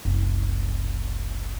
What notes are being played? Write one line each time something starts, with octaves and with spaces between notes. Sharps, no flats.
F#1 C2